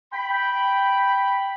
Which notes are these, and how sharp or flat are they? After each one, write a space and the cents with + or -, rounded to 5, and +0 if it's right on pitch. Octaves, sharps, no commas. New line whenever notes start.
G5 +0 B5 +0